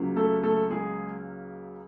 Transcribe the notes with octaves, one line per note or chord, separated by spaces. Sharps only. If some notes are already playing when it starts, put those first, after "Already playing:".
Already playing: C#2 C#3 F#3 A#3
A3 A4
A3 A4
G#3 G#4